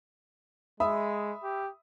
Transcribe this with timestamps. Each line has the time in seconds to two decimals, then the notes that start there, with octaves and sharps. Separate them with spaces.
0.80 G#3 E5 B5 D#6
1.43 G4